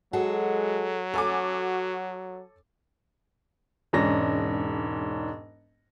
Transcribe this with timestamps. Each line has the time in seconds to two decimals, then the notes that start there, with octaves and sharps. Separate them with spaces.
0.13 F#3 G#3 F#4 G#4 A4
1.14 F#4 A4 C#5 G#5 D6
3.93 E1 G#2 C#4 D4 A#6